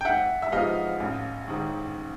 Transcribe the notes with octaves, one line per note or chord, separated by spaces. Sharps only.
G5
G#1 E5 F#5
E5
G#2 F3 G#3 B3 D#5 F5
A1
G#2 D#3